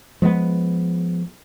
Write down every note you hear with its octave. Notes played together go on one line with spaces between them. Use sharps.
F3 G#3 A3 B3